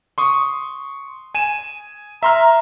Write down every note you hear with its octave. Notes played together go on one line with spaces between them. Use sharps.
C6 C#6 D#6
G#5 D#7 E7
E5 A#5 C6 F6